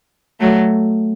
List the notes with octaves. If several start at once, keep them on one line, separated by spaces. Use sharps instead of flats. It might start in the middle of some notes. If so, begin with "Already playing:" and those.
F#3 A3